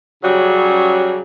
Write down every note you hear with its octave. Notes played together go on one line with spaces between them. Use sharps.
C#3 F#3 G3